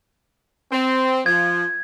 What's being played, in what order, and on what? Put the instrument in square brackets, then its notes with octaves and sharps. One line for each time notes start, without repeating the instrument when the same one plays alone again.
[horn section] C4
[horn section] F3 [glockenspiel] G#6